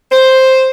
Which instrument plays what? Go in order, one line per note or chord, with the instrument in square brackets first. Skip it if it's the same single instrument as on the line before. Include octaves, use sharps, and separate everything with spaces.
[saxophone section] C5